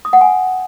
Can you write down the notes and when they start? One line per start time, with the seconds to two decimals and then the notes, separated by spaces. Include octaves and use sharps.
0.05 D#6
0.13 F#5
0.21 G#5